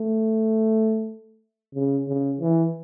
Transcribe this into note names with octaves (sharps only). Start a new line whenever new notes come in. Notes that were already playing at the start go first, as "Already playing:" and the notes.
Already playing: A3
C#3
C#3
E3